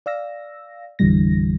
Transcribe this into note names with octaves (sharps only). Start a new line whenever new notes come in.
D5 F5 E6 A#6
A1 F2 D3 E3 G3 A#6